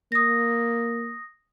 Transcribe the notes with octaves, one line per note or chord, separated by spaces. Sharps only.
A#3 D#6 A#6